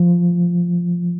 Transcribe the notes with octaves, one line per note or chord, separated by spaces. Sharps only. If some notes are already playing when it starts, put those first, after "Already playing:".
Already playing: F3